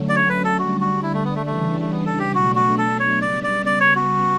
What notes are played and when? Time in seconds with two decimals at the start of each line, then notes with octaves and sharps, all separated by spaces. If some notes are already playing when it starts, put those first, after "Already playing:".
Already playing: D3 F#3 A3 C#4
0.09 D5
0.16 C#5
0.29 B4
0.44 A4
0.59 D3 G3 D4 F#4
0.81 F#4
1.03 E4
1.14 A3
1.24 B3
1.36 A3
1.46 C#3 E3 G3 A3 D4
1.81 A3
1.91 B3
2.06 A4
2.19 G4
2.34 B2 F#3 A3 D4 F#4
2.56 F#4
2.78 A4
2.99 C#5
3.21 C#3 G3 B3 D5
3.44 D5
3.66 D5
3.80 C#5
3.95 F#4